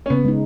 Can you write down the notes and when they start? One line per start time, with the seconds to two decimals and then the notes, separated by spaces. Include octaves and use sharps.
0.06 C#4
0.10 C#3 B3
0.25 G#3 D#4